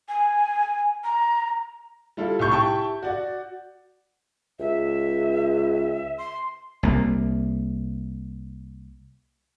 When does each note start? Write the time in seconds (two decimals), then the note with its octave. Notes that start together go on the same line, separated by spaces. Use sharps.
0.08 G#5
1.04 A#5
2.17 G3 E4 F4 A4
2.39 C2 A2 C#6 G6
2.52 E4 G4 G5 A5 C#6
3.03 F#4 D5 F#5
4.60 C#2 E5
6.18 C6
6.83 C2 A#3